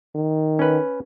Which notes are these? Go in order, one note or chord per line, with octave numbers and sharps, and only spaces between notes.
D#3
C#4 B4